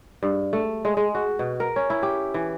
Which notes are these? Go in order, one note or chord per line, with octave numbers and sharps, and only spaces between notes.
G2
A3
G#3
G#3
F#4
B2
A#4
C#4
E4
G4
E3